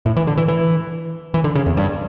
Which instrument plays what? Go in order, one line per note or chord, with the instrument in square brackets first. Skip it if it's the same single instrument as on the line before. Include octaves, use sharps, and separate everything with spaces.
[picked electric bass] A2
E3
D3
E3
E3
E3
D3
C#3
E2
G2